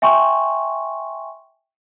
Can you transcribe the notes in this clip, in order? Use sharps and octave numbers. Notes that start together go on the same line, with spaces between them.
E5 G5 G#5 C6 C#6